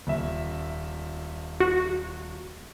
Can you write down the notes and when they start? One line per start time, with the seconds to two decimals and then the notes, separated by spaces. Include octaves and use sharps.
0.07 D#1 E5
1.60 F#4